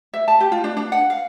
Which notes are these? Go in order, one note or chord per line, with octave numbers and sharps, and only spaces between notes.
E5
A5
G4
F4
D4
D4
F#5
F5